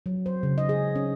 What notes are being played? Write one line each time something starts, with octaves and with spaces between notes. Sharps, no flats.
F#3
C5
C#3
D#5
G#4
C#4